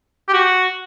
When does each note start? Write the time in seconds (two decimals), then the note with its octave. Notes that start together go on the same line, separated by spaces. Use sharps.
0.28 G4
0.34 F#4